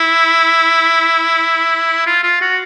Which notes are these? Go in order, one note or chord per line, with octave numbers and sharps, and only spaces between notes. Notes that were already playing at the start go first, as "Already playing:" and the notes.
Already playing: E4
F4
F4
F#4